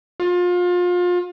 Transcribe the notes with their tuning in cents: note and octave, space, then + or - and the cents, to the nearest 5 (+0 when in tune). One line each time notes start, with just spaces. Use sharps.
F4 +30